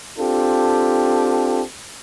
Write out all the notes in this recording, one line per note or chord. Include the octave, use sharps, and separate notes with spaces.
C4 D4 F4 G4 A4